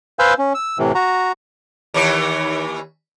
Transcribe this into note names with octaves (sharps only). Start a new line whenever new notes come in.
B4 C5 F5 G#5 E6 G6
C#4
E6
A2 C3 E3
F#4 A#5
D#2 E3 C#5